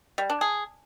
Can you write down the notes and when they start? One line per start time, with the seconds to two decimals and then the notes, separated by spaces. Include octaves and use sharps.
0.18 G3
0.30 D4
0.41 G#4